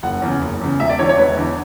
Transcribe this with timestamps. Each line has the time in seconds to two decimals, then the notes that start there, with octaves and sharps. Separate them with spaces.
0.03 F#1 F#5
0.22 E2 C#3
0.41 F#1
0.61 E2 C#3
0.80 E1 E5
0.89 D5
0.99 E2 D3 C#5
1.09 C#5
1.18 E1 B4
1.37 E2 D3